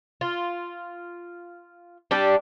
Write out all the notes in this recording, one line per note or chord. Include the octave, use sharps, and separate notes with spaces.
F4
G3 D4 G4